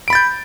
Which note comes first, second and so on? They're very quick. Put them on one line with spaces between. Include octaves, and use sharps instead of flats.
D7 B5 A6 G6